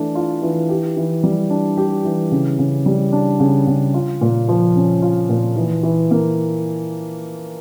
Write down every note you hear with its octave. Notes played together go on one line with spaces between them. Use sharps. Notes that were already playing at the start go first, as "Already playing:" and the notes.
Already playing: E3 A3 D4
F4
E3
G4
E3
G3
D4
G4
E3
C#3
C#3
G3
D4
C#3
C#3
F4
A#2
F3
C#4
F4
A#2
E3
E3
A#3